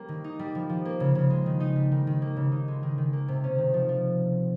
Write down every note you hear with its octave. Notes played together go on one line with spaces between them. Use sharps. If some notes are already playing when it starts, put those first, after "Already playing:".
Already playing: G3 A#3 C#4
D#3
D#4
G3
F3
F3
A#3
C#3
C#3
G#3
D#3
D#4
G3
D#3
D#3
A#3
C#3
D#4
G#3
D#3
D#3
A#3
C3
C#4
D#3
F3
F3